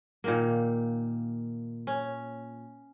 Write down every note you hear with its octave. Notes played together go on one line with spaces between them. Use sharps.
A#2 D#3 A#3
C#4